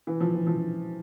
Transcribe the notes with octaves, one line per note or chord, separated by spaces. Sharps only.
E3
F3
E3
F3